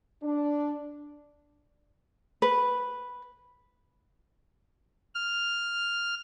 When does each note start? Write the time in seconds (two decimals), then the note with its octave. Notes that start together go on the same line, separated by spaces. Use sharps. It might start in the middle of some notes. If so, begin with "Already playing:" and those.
0.23 D4
2.42 B4
5.15 F6